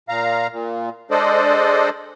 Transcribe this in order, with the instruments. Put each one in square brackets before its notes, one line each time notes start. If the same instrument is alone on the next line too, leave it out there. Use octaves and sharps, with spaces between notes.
[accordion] A#2 F5 A#5
A#2
G#3 D4 A4 C5 D5 D#5